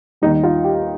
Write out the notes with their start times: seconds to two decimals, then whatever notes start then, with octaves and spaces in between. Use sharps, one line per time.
0.22 D#2 D#3 G3 D#4
0.44 F4
0.64 G4